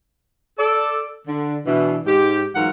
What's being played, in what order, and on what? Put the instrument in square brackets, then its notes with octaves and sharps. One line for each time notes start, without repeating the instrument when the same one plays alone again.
[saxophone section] A4 D5
D3
B2 E3 D4
G#2 G4
G#2 E3 F#3 F4 A#4 F#5